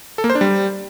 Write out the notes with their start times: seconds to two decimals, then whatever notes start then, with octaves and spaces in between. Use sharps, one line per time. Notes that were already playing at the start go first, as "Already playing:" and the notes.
0.18 A4
0.24 A#3
0.30 C5
0.35 D4
0.41 G3